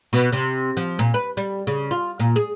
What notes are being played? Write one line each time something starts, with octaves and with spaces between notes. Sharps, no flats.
B2
C3
F3
A#2
B4
G3
C#3
F4
A#2
G#4